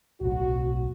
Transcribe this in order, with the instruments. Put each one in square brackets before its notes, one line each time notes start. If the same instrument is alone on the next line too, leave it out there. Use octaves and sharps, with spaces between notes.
[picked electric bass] D1 B1 [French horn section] F#4